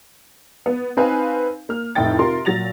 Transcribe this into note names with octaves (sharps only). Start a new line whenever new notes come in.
B3
C4 D#4 B4 F5 G#5
A#3 F6
F1 A2 D#4 E4 G5 A6
C3 F4 A#4 C6
A#2 F#3 A6 A#6 F7